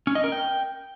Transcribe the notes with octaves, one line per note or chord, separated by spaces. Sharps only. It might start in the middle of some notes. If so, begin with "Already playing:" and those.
C#4
D#5
A#4
G5